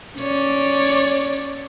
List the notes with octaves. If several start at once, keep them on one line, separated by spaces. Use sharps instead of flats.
C#4 C#5 D5